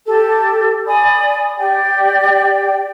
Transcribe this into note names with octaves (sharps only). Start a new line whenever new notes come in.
G4 A4
D5 G#5 B5 D#6
G4 D5 G5